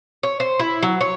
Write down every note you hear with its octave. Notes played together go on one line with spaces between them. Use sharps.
C#5
C5
E4
F#3
C#5